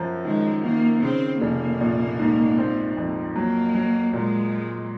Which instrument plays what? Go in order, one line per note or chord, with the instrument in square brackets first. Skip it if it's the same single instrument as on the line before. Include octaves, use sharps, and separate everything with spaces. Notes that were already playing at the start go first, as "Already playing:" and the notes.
Already playing: [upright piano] F#2 F3
[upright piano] D#3 [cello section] G#3
[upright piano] D#3 [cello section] A#3
[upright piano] C#3 [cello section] C4
[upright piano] F1 [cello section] A#3
[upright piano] A#1
G#2
C4
F2
[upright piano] F#3 [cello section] A#3
[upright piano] F#3
[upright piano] A#2 [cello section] G#3